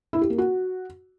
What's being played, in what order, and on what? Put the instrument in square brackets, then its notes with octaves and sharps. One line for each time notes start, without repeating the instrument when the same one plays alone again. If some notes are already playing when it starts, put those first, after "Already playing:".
[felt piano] E4
G4
A#3
F#4